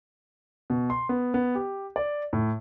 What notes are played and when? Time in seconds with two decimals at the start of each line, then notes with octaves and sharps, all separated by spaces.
0.70 B2
0.90 C6
1.09 B3
1.34 B3
1.55 G4
1.96 D5
2.33 A2